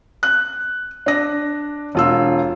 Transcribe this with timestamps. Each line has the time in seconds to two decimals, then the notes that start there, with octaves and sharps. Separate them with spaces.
0.23 F#6
1.06 D4 A#6
1.95 E1 F4 E6